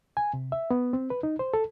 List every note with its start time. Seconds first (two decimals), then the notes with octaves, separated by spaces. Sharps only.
0.17 G#5
0.33 C3
0.52 E5
0.71 B3
0.93 C4
1.10 B4
1.23 D#4
1.39 C5
1.54 A4